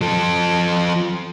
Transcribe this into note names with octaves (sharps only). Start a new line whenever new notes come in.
F3 A4